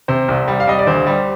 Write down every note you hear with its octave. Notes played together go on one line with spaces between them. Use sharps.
C3 C5
C2
G3
F5
G3 D#5
D5
D2 C5
G3